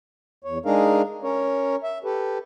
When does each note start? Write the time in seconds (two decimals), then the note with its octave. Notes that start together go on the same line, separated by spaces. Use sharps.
0.44 E2 C#5
0.66 G#3 D4 D#4 G#4 A#4 F5
1.23 C#4 A#4 C#5
1.83 E5
2.04 G4 A4 B4